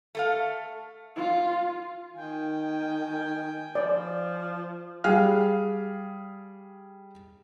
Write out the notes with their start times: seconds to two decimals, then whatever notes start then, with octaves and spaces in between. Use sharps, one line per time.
0.15 A3 A4 F5
1.16 F4
2.16 D#3 G5 G#5
3.75 F3 D5
5.04 G3 G#4 F5 F6